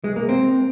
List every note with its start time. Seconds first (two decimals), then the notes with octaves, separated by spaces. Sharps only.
0.04 G#3
0.16 A#3
0.29 C4